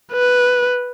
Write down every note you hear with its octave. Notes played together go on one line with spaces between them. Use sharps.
B4